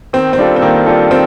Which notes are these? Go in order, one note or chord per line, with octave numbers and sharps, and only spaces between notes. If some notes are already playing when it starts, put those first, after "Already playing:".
D#3 C4
C4
G3 D4 F4 A4
C4
D#3 A#3
G3 D4 F4 A4
D#3 C4